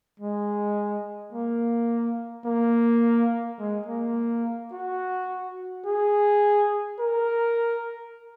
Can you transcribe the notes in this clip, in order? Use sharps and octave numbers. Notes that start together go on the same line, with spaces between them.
G#3
A#3
A#3
G#3
A#3
F#4
G#4
A#4